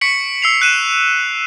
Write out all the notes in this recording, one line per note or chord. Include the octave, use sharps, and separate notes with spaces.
C#6 B6 C#7 D7 F#7
E6 C7 F7
F#6 D#7 E7